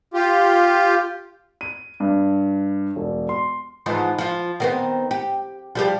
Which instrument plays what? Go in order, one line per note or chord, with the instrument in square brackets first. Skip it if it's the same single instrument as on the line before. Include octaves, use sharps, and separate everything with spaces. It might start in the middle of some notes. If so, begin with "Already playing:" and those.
[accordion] F4 G4
[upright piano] D#7
G2
E1
C6
[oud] G#2 E3 F3
F3 F4
D#3 B3 C4
G4
F3 G3 G4